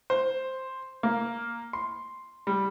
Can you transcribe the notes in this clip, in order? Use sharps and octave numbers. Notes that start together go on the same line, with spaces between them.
C5
A#3
C6
G3